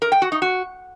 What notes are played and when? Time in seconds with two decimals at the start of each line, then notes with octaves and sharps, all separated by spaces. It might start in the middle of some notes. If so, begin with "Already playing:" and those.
0.02 A#4
0.12 G5
0.22 F#4
0.32 D#4
0.42 F#4